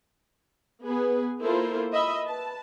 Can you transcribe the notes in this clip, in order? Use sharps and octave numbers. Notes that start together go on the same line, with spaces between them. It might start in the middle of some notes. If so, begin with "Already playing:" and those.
B3 G#4 B4
A#3 E4 F4 A4 A#4 C5
D#5 E5 B5
B4 A5